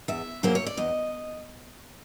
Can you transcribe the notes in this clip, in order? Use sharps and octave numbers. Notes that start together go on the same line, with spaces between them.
E2 E5
C#3 F#3 A#3 C#4 C5
C#5
D5
E2 D#5